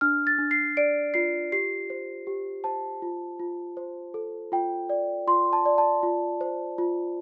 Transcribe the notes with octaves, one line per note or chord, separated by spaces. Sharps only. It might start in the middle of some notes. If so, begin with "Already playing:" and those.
D4 F6
A6
D4
C7
D5 D7
F4 C7
G4 C7
C5
G4
C5 A5
F4
F4
C5
A4
F4 G5
D5
F4 C6
A5
D5
A5
F4
C5
F4